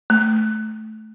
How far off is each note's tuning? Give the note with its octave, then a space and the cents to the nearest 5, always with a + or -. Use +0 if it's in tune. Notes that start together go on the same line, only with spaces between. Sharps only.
A3 -15